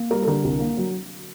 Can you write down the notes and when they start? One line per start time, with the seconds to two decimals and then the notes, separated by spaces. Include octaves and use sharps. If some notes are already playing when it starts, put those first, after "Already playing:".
Already playing: A#3
0.10 G3 A#4
0.22 A4
0.27 D3 A#4
0.44 C2
0.60 A#3
0.77 F#3